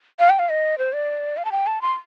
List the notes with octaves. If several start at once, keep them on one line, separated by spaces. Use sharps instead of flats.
F5
G5
F5
D#5
C5
D5
F5
A5
G5
A5
C6